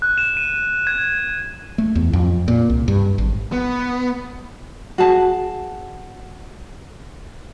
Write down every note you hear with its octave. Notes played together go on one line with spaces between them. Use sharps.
F#6
E7
D#7
G#6
G#6
A3
E2
F2
A#2
C2
G2
G#1
B3
F#4 G#4 A5